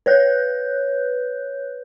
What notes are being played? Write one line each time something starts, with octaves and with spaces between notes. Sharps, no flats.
B4 C#5 F#6 G6